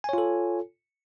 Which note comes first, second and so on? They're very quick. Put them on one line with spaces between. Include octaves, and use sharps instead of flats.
G#5 C#5 F4 A4